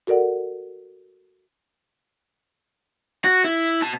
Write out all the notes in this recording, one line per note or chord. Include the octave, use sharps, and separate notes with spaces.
F#4 A4 A#4 D5 F#5
F#4
E4
B2 A5